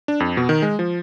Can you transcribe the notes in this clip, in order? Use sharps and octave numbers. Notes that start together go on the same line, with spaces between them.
D4
F2
B2
D#3
G#3
F3